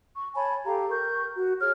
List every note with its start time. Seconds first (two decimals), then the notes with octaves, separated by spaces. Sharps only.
0.15 C#6
0.34 C#5 G#5 A5 B5
0.66 G4 A4 F5 A#5
0.89 A#4 C#6 G6
1.34 F#4
1.60 G#4 C#5 F6